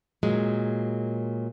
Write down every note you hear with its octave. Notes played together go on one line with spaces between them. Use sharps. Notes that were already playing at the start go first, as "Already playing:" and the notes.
A#2 F#3 G#3